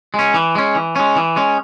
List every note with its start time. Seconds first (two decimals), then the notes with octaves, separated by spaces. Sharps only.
0.14 G#3
0.19 C#4
0.34 E3
0.55 G#3 C#4
0.75 E3
0.96 G#3 C#4
1.16 E3
1.36 G#3 C#4